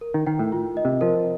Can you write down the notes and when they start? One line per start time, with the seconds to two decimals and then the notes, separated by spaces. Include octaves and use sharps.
0.01 A#4
0.14 D#3
0.27 D#3 G5
0.39 A2
0.52 F4
0.77 D#5
0.85 C3
1.01 F3 A#4